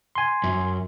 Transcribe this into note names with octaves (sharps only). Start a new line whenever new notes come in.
G#5 C6
F#2